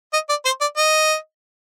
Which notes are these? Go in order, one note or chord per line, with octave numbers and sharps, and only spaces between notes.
D#5
D5
C5
D5
D#5